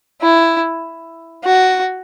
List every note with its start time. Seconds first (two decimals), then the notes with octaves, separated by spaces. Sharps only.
0.21 E4
1.44 F#4